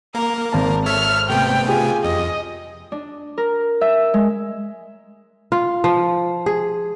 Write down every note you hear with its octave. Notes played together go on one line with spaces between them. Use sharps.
A#3 A#4
G#1 A#4 A5
A4 C#5 E5 F6
C3 A3 B3 G5
F4 G4 G#4 G#5
F2 D#5
D4
A#4
E5
G#3
F4
F3
G#4